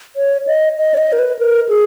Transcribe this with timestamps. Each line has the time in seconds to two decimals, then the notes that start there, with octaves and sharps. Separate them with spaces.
0.16 C#5
0.47 D#5
0.78 D#5
0.94 C#5
0.97 D#5
1.13 A#4
1.19 B4
1.39 A#4
1.69 G#4